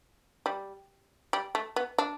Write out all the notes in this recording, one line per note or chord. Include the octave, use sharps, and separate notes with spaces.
G3
G3
A3
B3
D4